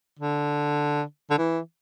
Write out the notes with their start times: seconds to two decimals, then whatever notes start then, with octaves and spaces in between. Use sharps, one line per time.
0.19 D3
1.31 D3
1.38 E3